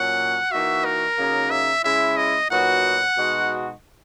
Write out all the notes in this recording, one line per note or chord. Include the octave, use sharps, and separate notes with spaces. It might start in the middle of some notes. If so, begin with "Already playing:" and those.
Already playing: A#2 F#3 C#4 F#5
E3 A#3 D#4 F#4 E5
A#4
C#3 F#3 A#3 D#4
E5
C#3 G#3 C#4 E4 E5
D#5
A#2 F#3 B3 D#4 F#4 F#5
B2 G#3 D#4 F#4